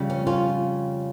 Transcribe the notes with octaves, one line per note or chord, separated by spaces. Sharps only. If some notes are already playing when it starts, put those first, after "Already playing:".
Already playing: F2 C#3 G3
C#4
C#4 F4